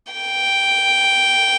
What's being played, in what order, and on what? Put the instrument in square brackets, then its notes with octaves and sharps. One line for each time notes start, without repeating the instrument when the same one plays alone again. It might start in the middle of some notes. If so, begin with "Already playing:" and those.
[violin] G5